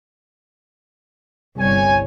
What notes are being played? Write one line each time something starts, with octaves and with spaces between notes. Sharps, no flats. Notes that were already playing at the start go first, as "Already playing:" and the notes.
G1 C2 C#5 G#5